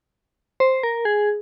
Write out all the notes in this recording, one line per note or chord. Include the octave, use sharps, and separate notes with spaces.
C5
A#4
G#4